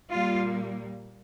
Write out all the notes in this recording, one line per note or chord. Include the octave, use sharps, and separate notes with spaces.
A#2 G3 A#3 F4